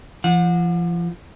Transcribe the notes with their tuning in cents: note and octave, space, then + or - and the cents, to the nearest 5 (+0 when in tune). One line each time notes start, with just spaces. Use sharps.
F3 -35 F#5 -35